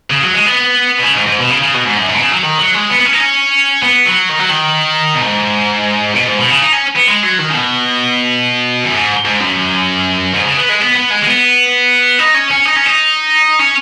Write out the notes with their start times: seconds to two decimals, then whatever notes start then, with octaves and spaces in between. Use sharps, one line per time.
0.10 C#3
0.23 F#3
0.34 G#3
0.46 B3
0.99 B2
1.03 C#3
1.15 G#2
1.26 G#2
1.39 B2
1.50 C#3
1.62 C#3
1.74 B2
1.85 G#2
1.97 F#2
2.09 G#2
2.15 B2
2.19 C#3
2.32 F#3
2.43 D#3
2.58 F#3
2.74 G#3
2.90 B3
3.00 B3
3.05 C#4
3.13 D#4
3.20 C#4
3.83 B3
4.06 F#3
4.29 D#3
4.39 F#3
4.49 D#3
5.15 B2
5.22 G#2
6.15 B2
6.27 G#2
6.38 B2
6.50 C#3
6.61 D#4
6.73 C#4
6.96 B3
7.08 G#3
7.23 F#3
7.39 D#3
7.50 C#3
7.54 B2
8.84 F#2
8.95 G#2
9.26 G#2
9.40 F#2
10.34 G#2
10.45 C#3
10.57 B3
10.69 G#3
10.81 B3
10.95 B3
11.10 G#3
11.23 G#3
11.27 B3
12.19 D#4
12.34 C#4
12.51 C#4
12.66 D#4
12.75 C#4
12.86 D#4
13.59 C#4